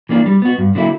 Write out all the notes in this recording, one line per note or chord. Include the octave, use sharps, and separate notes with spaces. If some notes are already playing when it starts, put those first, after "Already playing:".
E3 A#3 D4
G3
B3 F#4
G2
D3 F#3 A#3 E4